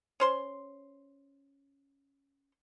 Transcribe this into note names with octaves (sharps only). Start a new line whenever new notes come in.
C#4 C5 C6